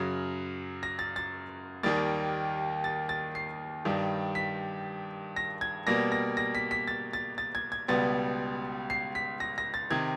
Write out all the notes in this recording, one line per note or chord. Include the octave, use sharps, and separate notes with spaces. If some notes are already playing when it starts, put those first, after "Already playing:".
Already playing: F#2 C#3 F#3
A#6
A6
A6
D#2 D#3 G3 A#3 A6
A6
A6
C7
G2 D#3 G3
B6
A#6
G#6
B2 G3 A#3 A#6
A#6
A#6
B6
B6
A6
A6
A6
G#6
G#6
C#2 B2 G3 B3 A6
C7
B6
A#6
A#6
A6
C3 D#3 G#6